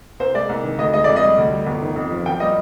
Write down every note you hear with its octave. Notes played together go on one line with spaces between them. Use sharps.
C2 C5
G#3 D5
C2
D#3
D2 D#5
G#3 D#5
F2 D5
D#5
G3
D2
G3
G1
D#3
F2
F3
G#1 G5
G3 D#5